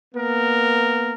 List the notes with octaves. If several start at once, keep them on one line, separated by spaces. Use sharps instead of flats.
A#3 B3 A#4